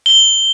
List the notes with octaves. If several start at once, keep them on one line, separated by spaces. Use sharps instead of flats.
G7